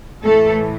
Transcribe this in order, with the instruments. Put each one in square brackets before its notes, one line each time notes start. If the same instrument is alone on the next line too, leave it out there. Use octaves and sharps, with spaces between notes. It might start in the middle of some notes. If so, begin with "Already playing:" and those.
[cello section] A2 E3 A3 A4